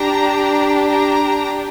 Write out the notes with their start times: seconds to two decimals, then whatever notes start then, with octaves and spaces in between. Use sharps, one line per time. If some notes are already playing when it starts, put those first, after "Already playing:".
Already playing: D4 G4 A#5
0.86 A#5